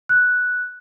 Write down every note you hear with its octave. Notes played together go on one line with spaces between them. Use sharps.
F#6